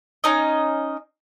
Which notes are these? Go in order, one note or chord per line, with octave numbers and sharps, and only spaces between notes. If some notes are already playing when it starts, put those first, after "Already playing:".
C#4 D#4 D#5